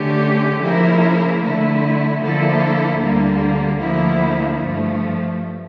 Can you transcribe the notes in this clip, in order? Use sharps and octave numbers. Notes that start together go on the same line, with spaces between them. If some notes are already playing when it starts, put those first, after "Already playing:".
Already playing: D3 A3 C#4 G4
C#3 F3 A#3 E4 A#4
D3 A3 E4
D3 F3 A#3 E4 A4
D2 D3 G3 A#3
D2 D3 F3 A#3 E4
G2 F3 A3